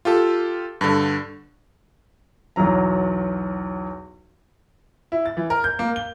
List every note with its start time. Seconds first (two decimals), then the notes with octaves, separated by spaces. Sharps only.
0.05 F4 G4 A4
0.81 G2 D3
2.56 B1 E2 F#3 A#5
5.12 E4
5.26 A6
5.37 E3
5.50 A#4
5.64 G6
5.79 A#3
5.96 G7